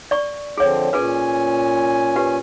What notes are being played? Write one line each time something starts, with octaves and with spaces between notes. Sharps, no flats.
D5 C#6
D3 F3 C4 G#4 C#5
A#2 C#4 G#4 A#4 B4 G#5
G4 B4